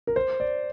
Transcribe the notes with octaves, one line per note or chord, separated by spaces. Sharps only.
A#4
C5
D5